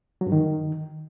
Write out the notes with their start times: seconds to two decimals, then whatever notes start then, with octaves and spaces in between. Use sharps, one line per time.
0.21 F#3
0.27 G2
0.32 D#3